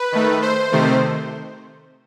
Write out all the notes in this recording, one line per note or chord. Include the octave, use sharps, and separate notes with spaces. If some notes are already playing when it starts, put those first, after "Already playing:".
Already playing: B4
D#3 A3
C5
C3 D#3 A3